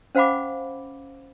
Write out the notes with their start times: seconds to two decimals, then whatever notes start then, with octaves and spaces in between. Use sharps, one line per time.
0.15 C#4 C5 F5 F#5 B5 D6